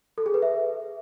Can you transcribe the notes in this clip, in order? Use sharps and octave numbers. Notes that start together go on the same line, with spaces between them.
A4
G#4
B4
E5